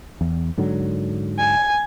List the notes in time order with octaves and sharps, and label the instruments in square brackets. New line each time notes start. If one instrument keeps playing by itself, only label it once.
[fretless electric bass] E2
G#2 D3 F#3
[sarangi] G#5